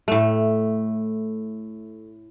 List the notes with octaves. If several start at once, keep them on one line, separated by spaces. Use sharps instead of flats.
A2 A3